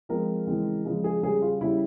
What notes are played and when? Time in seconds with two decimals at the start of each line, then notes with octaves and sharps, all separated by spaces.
0.09 F3 G#3 C4 A#4
0.47 C#3 E3 G#3 C4
0.85 C#3 F3 G#3
1.04 G#4
1.22 C#3 G3 C#4 G#4
1.42 F4
1.61 C#3 G3 C#4 E4